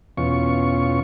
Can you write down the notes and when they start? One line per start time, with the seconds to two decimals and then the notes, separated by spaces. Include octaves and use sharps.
0.17 E2 B2 C#4 F4 C#6